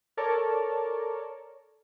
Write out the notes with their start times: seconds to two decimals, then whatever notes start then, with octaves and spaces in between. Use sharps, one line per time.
0.17 A4 A#4 C#5 D5 A5